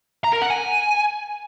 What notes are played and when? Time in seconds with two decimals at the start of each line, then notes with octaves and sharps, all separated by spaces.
0.24 A#5
0.33 A#4
0.42 F#5
0.50 G#5